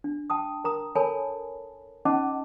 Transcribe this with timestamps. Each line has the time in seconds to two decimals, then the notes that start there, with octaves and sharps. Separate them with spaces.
0.04 D4
0.30 G5 A5 D#6
0.64 A#4 A#5 D#6
0.95 A4 A#4 C#5 G#5 A5 B5
2.05 C#4 D#4 D#5 F#5 A5 D6